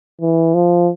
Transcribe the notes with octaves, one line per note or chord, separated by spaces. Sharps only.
E3
F3